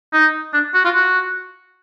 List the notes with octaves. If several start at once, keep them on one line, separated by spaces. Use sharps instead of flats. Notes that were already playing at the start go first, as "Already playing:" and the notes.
D#4
D4
F#4
F4
F#4